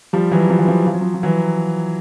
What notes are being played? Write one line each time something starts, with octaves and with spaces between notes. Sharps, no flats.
F3 G3
E3 F#3
F3
E3
F3
F3
F#3
F3
F3
E3 F#3